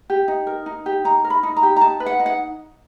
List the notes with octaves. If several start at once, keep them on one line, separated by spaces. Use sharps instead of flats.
G4
D#4
A#4
D#4
G4
D#4 A#5
A#4
B5
D#4
A#5
G4
A#5
D#4 A5
B4
F#5
D#4
F#5